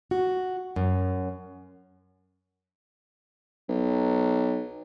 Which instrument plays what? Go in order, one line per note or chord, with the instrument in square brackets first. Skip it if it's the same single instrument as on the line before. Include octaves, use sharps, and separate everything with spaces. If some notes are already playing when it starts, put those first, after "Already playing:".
[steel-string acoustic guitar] F#4
F#2
[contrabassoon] B1